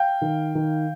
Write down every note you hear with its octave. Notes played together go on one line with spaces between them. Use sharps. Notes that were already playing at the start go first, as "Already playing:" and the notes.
Already playing: F5 G5
D#3
D#3